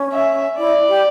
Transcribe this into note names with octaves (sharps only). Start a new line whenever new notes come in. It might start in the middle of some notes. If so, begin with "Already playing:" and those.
Already playing: C#4
E5
E4 D5
G4